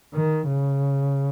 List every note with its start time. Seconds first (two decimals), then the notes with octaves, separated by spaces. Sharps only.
0.14 D#3
0.47 C#3